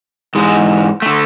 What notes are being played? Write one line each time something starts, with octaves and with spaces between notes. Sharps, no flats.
G#2 E3 G#3
D3 A3